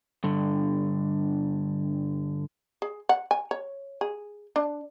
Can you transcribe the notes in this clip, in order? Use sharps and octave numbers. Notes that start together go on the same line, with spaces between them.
G2 D3
G#4
F#5
G#5
C#5
G#4
D4